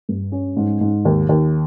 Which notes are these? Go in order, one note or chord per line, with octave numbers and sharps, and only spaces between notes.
G2
C#4
G#2
G#2
D#2
D#2